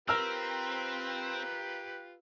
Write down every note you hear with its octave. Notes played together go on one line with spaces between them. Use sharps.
C4 F4 G4 A#4 B4 E6 F6